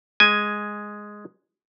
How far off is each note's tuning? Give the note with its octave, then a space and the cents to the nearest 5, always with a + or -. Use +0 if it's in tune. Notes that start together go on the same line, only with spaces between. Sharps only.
G#3 +0 G#5 +0